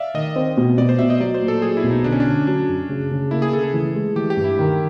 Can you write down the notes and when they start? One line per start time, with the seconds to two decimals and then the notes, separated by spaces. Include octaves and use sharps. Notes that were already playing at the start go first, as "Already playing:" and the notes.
Already playing: D5 E5 F5
0.14 D#3 D#5
0.36 C4
0.57 B2
0.78 B2 D5
0.89 C5
0.99 B2 E5
1.10 D#5
1.20 F#3 D5
1.34 C5
1.42 A#2
1.48 A4
1.62 F#3 G#4
1.77 E4
1.84 B1
1.91 D#4
2.04 D3 D4
2.12 C#4
2.20 D4
2.26 D3
2.47 F#3 D4
2.69 F#2
2.89 C#3
3.11 C#3
3.31 A#3 E4
3.42 G#4
3.53 C#3 A4
3.63 A4
3.74 E3
3.95 G#3
4.16 E3 G4
4.30 G4
4.37 G2
4.44 E4
4.59 D#3